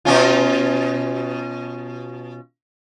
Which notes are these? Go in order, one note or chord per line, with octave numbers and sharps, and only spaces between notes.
B2 C#4 F4